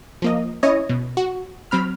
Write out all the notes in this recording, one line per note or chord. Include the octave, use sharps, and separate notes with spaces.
F3 A#3 D#5
C#4 E4 C#5 D#5
B2
F#4
F#3 C4 B5 F6